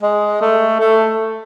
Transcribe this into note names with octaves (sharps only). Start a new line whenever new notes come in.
G#3
A3
A3